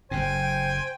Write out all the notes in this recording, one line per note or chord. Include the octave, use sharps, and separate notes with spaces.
F#1 F#2 A2 C5 G5 G#5